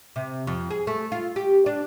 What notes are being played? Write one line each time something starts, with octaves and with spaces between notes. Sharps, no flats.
C3
F2
G#4
A3
F4
G4
D4